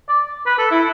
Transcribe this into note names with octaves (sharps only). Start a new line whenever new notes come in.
D5
B4
A4
E4